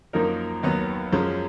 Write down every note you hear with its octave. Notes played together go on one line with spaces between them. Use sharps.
F#2 F3 A#3 D#4 A#4
D#2 D#3 F#3 B3
F#2 F3 G#3 C#4